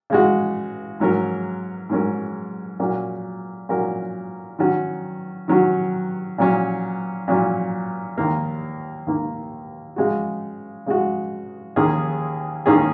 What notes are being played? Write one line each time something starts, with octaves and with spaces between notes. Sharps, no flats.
C#3 G#3 F#4
G#2 F#3 C#4 A#4
G#2 F#3 C#4 A#4
A#2 F#3 C#4 F#4 A#4
A#2 F#3 C#4 F#4 A#4
D#3 F#3 C#4 F#4
D#3 F#3 C#4 F#4
A#2 F#3 C#4
A#2 F#3 C#4
D#2 D#3 A#3
D#2 D#3 A#3
C#3 G#3 F#4
C#3 G#3 F#4
D#2 D#3 A#3 C#4 G#4
D#2 D#3 A#3 C#4 G#4